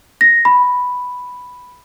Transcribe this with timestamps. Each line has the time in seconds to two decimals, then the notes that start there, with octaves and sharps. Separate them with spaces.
0.21 A#6
0.45 B5